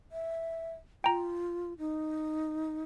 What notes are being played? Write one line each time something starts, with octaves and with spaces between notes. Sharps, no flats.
E5
F4 G5 A#5
D#4